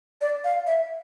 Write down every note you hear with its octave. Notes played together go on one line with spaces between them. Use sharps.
D5
F5
E5